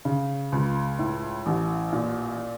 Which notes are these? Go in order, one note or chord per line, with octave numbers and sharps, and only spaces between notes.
C#3
C#2
A2
A1
A#2